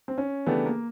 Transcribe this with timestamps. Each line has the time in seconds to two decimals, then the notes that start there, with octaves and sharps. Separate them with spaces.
0.08 C4
0.18 C#4
0.46 C#3 E3 A3 B3 D4 G4
0.65 A#3